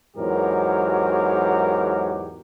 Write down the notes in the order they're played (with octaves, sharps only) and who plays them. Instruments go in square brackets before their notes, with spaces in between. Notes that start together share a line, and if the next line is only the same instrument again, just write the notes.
[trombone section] E2 G#2 F#3 G4 A#4